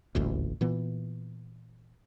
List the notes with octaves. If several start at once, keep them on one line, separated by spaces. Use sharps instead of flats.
D#1 A1 D2
A#2 E3 B3